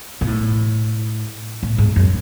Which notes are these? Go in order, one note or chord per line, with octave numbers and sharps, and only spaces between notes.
A#2
A2
A2
G#2
F#2